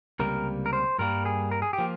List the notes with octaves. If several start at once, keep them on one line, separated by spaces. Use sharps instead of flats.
C#2 C3 G3 A#3 A#4
A#4
C5
G2 G3 A#3 A#4
G#4
A#4
G#4
G4
F3 A#3